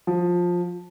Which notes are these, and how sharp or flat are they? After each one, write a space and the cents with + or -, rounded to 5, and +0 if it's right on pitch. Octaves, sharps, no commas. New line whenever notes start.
F3 +15